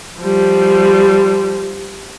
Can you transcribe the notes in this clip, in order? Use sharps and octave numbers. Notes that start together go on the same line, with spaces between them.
F3 G3